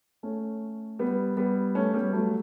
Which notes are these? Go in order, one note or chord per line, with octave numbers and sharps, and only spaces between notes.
A3 C#4
G3 B3
G3 B3
A3 C#4
G3 B3
F#3 A3